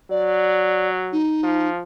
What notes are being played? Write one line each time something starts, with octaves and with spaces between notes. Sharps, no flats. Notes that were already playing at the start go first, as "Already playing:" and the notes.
F#3 D5
D#4
F3